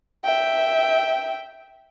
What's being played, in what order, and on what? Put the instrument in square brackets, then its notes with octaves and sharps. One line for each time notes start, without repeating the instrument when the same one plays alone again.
[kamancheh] E5 G5